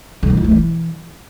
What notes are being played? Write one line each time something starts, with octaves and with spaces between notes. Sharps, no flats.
D3
D#3
F4
A3
E3